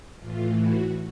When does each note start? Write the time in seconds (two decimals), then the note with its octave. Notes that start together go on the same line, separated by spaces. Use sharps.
0.19 A2 E3 F4
0.56 F#4